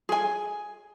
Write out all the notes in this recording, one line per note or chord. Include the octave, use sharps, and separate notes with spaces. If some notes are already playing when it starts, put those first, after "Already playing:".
G#4 G#5